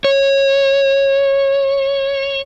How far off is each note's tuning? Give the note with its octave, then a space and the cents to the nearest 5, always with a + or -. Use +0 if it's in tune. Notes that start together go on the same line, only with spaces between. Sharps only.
C#5 -15